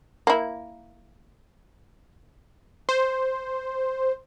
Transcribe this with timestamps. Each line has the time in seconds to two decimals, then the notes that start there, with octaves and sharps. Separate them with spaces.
0.27 A#3 E4
2.89 C5